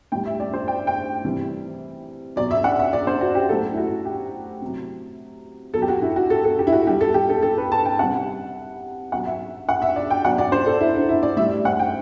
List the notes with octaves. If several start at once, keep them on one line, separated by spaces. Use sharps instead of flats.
A2 G3 G5
E5
D5
C5
G5
G5
C3 E3 G3
B2 F#3 D5
E5
F#5
E5
D5
C5
F#4
G4
A2 F#3 A4
E4
F#4
G4
C3 F#3
B2 F#3 A4
G4
F#4
E4
F#4
A4
A4
G4
E4
F#4
B2 G3 G4
A4
G4
A4
A4
B4
A5
G5
C3 G3 F#5
B2 F#3 F#5
E5
F#5
E5
D5
G5
B2 F#3 F#5
D5
C5
A4
E4
D4
E4
D5
A2 G3 E5
F#5
G5